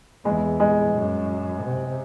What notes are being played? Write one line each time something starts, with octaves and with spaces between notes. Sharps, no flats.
E2 G#3
G#3
F#2
C3